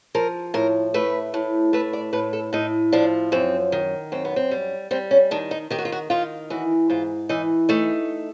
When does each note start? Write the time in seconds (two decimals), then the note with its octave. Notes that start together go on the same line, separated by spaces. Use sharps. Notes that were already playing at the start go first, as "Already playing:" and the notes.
0.15 F3 A#4
0.54 A2 A#4
0.94 A3 B4
1.34 A2
1.73 A3 B4
1.93 D5
2.13 A2 B4
2.33 A4
2.53 A2 D#4
2.92 F3 D4
3.32 F#2 C4
3.72 D#3
4.12 F#2 C4
4.25 B3
4.36 C4
4.51 G3
4.91 G3 C4
5.11 C#4
5.31 D#3 D4
5.51 D#4
5.70 D#3 G4
5.79 F#4
5.85 F4
5.92 F#4
6.10 D#3 F4
6.50 E3 F#4
6.90 G#2 F4
7.29 E3 D#4
7.69 A3 D#4